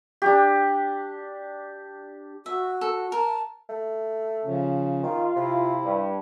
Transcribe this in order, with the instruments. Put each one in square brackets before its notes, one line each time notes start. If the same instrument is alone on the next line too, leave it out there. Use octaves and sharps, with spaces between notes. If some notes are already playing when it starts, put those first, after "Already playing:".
[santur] D4 G4
[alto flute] F#4 [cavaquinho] E5
[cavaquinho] A4
[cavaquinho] A#4 [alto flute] A5
[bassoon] A3
[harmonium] C#3 F3 C#4
[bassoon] D#3 [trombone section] F4
[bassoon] C3 [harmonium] E4
[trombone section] G2